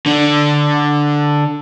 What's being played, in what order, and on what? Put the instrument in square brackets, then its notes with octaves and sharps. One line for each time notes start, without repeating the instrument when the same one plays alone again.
[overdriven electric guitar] D3 D4